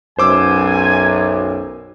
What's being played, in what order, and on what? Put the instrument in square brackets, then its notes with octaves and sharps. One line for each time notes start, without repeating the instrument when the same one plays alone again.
[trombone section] B1 F#2 [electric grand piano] C5 D6 E6 [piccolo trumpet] G#5